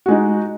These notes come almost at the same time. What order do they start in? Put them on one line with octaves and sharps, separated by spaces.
F#4 G#3 D#4